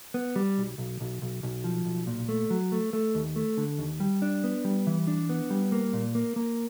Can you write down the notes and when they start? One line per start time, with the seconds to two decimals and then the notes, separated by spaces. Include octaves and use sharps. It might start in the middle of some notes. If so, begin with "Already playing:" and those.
0.14 B3
0.36 G3
0.58 B1
0.78 B1
1.01 B1
1.22 B1
1.43 B1
1.64 F3
1.85 B1
2.07 A#2
2.29 A3
2.50 F#3
2.72 A3
2.93 A3
3.15 D#2
3.36 A3
3.57 D3
3.78 D#2
4.00 G3
4.22 D4
4.44 B3
4.65 G3
4.87 E3
5.07 D4
5.29 B3
5.50 G3
5.72 A#3
5.93 A#2
6.15 A#3
6.36 A#3